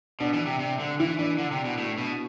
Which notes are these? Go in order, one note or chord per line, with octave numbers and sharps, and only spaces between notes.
B2 D4
E3
C3
C3
D3
E3 E4
E3 D4
D3
C3
B2
A2
B2